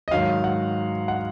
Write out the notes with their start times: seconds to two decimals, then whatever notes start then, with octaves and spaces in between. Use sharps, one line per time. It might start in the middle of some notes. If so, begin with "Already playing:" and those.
0.08 D#5
0.11 G#2 D#3 F#3 F5
0.44 F#5
1.08 F#5